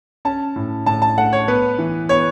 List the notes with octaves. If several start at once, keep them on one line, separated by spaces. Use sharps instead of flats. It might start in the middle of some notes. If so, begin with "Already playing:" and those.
C#4 A5
A2
A2 A5
A5
A3 F#5
C#5
B3 B4
E3
B3 C#5